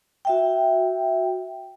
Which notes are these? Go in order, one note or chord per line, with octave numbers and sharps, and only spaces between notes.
F#4 E5 G5